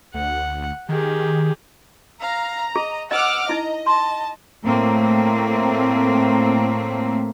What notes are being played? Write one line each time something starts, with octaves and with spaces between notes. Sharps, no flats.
D2 F#5
D#3 G4 G#4
F5 A#5
G#4 D#5
D#5 F#5 D6 E6 F6
D#4 E4 D#5 A#5
A5 C6
A2 A3 A#3 C4